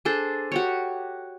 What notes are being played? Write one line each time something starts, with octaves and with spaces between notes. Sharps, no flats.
D4 G#4 A4 C5
F#4 G4 C#5